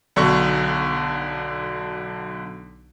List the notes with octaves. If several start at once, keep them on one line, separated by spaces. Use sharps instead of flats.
B1 D3 D4 F#4 C#6